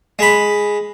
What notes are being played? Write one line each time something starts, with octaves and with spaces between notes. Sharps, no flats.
G#3 B5